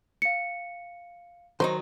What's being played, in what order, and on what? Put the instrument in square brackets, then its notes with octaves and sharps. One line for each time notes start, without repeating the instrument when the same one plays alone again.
[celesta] F5 C#7
[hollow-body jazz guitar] D#3 F#3 D#4 [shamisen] C5